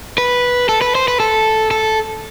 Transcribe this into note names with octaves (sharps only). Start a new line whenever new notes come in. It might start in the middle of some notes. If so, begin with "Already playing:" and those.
B4
A4
B4
C5
B4
A4
A4